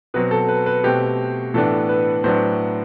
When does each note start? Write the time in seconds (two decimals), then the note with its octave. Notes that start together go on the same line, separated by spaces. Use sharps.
0.14 B2 F#3 C4 B4
0.31 A4
0.49 B4
0.66 B4
0.84 B2 A3 C4 G4
1.54 A2 E3 B3 D4 A4
1.89 B4
2.24 A2 F#3 B3 D4 C5